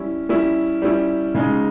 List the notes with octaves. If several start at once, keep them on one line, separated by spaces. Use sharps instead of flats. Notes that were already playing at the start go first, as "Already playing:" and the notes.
Already playing: G3 C#4 E4
G3 C#4 E4
G3 C#4 E4
C#3 G#3 D#4